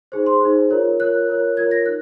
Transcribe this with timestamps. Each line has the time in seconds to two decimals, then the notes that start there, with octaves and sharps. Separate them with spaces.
0.12 D#4 G#4 C5
0.26 C6
0.41 D#4 G#4 C5
0.70 F4 A#4 C#5
0.99 F4 A#4 C#5 F#6
1.28 F4 A#4 C#5
1.57 F4 A#4 C#5 G#6
1.71 A#6
1.86 D#4 F#6